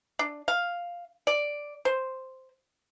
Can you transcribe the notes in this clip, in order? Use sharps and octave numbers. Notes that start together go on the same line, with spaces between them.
D4
F5
D5
C5